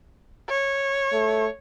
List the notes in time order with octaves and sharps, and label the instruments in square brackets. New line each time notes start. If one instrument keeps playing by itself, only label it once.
[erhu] C#5
[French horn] A3